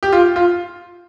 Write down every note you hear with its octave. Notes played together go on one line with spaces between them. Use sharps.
G4
F4
F4